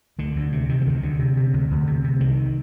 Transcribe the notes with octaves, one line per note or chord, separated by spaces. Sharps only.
D2 D3
D2
C3
C3 D#3
F3
D2 D#3
D2 D3
C3
C3
D2
D2
C3
C3
C2 D#3